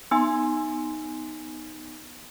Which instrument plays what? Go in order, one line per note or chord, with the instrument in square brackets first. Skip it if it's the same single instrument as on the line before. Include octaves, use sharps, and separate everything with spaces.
[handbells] B3 D#4 G#5 C6